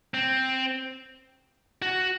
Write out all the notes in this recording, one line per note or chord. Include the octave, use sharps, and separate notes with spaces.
C4
F#4